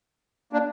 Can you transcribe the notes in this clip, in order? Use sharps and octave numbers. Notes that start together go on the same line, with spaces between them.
A#3 D4